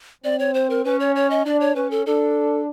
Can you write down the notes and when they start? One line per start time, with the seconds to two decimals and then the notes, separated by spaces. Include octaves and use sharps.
0.24 C4 D5
0.39 C#5
0.54 C5
0.70 A#4
0.85 C#4 B4
1.00 C#5
1.16 C#5
1.30 D#5
1.45 D4 D5
1.60 C#5
1.76 C#4 B4
1.91 A4
2.06 D4 A4